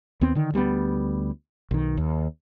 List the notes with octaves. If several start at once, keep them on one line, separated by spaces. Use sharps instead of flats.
D#2 B3 C4
D3 D#3
D2 G3 G#3 B3
B1 D#3
D#2